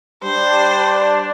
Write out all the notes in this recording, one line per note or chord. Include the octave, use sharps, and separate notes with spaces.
G3 D4 C5